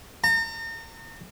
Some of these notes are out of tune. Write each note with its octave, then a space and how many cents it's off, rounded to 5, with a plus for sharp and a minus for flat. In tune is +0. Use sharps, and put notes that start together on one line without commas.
A#5 -40